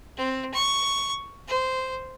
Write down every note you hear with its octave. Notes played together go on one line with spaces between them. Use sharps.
C4
C#6
C5